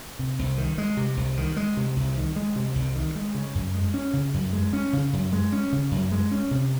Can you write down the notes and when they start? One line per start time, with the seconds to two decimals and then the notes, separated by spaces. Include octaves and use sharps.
0.19 C3
0.39 C2
0.58 D#3
0.78 G#3
0.97 C3
1.17 C2
1.37 D#3
1.57 G#3
1.77 C3
1.96 C2
2.16 D#3
2.36 G#3
2.56 C3
2.75 C2
2.95 D#3
3.15 G#3
3.35 C#3
3.55 F#2
3.75 G#3
3.94 C#4
4.13 C#3
4.34 F#2
4.53 G#3
4.73 C#4
4.93 C#3
5.13 F#2
5.33 G#3
5.52 C#4
5.72 C#3
5.91 F#2
6.12 G#3
6.31 C#4
6.51 C3